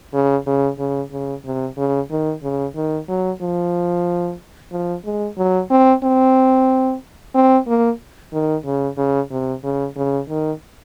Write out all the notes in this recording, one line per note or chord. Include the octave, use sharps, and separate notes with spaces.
C#3
C#3
C#3
C#3
C3
C#3
D#3
C#3
D#3
F#3
F3
F3
G#3
F#3
C4
C4
C4
A#3
D#3
C#3
C#3
C3
C#3
C#3
D#3